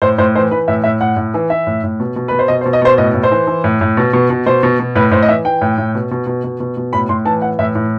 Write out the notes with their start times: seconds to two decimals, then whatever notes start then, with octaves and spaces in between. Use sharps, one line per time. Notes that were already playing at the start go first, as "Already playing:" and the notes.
0.02 A2 C5
0.18 A2 C5
0.35 E3 C5
0.51 E3 B4
0.68 A2 E5
0.84 A2 E5
1.01 A2 F#5
1.17 A2
1.34 E3
1.50 E3 E5
1.67 A2
1.84 A2
2.00 B2
2.16 B2
2.28 B2 B4
2.39 C5
2.48 B2 D#5
2.61 C5
2.65 B2
2.73 D#5
2.82 B2 C5
2.98 A2 D#5
3.14 A2
3.23 C5
3.31 E3
3.47 E3
3.64 A2
3.81 A2
3.97 B2
4.13 B2
4.30 B2
4.46 B2 C5
4.63 B2
4.79 B2
4.95 A2 B4
5.11 A2 C5
5.22 D#5
5.28 E3 E5
5.45 E3 G5
5.61 A2
5.78 A2
5.95 B2
6.11 B2
6.27 B2
6.44 B2
6.60 B2
6.77 B2
6.93 A2 B5
7.09 A2 C6
7.25 E3 A5
7.42 E3 F#5
7.59 A2 E5
7.75 A2